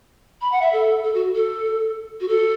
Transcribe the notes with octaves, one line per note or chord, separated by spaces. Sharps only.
B5
F#5
E5
A4
A4
F#4
A4
F#4
A4